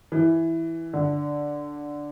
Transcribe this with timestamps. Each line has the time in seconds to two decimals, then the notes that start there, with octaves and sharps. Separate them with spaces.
0.12 E3
0.93 D3